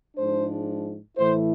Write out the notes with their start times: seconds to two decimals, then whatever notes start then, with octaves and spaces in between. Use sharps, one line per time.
0.16 G#2 F3 G#3 D4 C5
1.18 A2 E3 A3 E4 C5